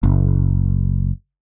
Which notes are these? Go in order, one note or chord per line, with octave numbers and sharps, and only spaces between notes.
F#1